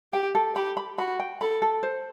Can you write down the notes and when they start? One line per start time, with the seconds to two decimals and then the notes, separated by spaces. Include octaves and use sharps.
0.13 G4 G5
0.35 A4
0.56 G4 B5
0.77 B5
0.98 F#4 B5
1.19 G5
1.41 A4 B5
1.62 A4
1.83 C5